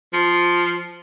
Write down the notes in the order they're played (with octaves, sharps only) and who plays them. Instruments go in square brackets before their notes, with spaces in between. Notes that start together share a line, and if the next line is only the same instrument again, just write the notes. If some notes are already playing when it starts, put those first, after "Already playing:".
[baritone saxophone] F3